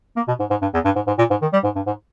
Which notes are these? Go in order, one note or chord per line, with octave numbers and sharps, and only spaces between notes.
A#3
B2
G#2
G#2
G2
E2
G2
G#2
G#2
A#2
G#2
D#3
G3
G#2
G2
G#2